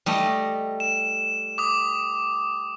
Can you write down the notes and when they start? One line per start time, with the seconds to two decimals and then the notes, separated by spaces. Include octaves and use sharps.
0.06 G3 A3 D#5
0.80 E7
1.58 D6 D#6